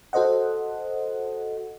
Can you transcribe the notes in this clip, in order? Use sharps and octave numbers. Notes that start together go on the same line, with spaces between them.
F#4 A4 C5 D#5 F#5